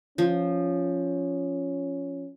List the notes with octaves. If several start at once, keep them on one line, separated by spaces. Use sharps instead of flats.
F3 C#4